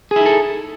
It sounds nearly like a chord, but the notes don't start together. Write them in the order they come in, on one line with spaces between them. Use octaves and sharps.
G#4 E4 D#4 A4